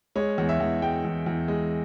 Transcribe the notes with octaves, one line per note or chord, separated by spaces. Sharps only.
G#3 C#5
E2
E5
E2
G#3 G5
E2
E2
G#3